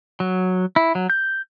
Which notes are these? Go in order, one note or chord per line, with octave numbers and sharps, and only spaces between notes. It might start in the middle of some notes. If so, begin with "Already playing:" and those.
F#3
E4
F#3
G6